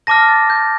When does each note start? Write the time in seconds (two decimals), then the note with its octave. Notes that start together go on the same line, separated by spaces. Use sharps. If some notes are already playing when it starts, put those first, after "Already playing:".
0.07 A5 D6 F6 A#6
0.28 A6
0.50 G6